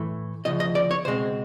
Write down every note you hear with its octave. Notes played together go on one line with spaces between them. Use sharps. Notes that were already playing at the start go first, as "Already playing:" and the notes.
Already playing: A2 E3 A3
D2 C#3 F3 D#5
D#5
D5
C#5
C#2 B2 G#3 C4 C5